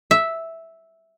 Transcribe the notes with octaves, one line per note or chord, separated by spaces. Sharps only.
E5